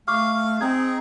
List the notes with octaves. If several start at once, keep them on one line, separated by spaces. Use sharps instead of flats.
A3 F5 C#6 D6 F6
C4 D#4 G#4 G#6